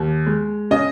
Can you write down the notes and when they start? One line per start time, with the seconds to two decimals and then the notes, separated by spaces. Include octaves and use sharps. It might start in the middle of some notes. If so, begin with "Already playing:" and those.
Already playing: D#2
0.27 G#3
0.71 C#3 D#5